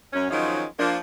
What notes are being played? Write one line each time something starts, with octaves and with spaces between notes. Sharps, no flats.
F#2 C#4
D#3 F3 F#3 G#3 C#4 D#4
F3 A#3 D4